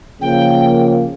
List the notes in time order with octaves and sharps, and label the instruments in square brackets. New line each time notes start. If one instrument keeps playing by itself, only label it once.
[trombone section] C#3 F3 A#3 [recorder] G5